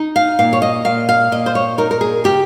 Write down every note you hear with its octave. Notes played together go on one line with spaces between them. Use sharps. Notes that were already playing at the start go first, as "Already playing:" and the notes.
Already playing: D#4
F5
A#2 F5
C#5
D#5
A#2 F5
F5
A#2 D#5
C5
C#5
D#4 A#4
A#4
G#4
C#3 G4